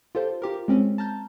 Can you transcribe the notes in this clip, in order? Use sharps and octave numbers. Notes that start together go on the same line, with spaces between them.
F4 G4 A4 C5 G5
F4 G4 A#4
G#3 C4 C#4
A5 A#5 F6 G6